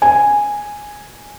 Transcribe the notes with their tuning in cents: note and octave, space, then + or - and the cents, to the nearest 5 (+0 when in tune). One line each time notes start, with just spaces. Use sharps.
G#5 -5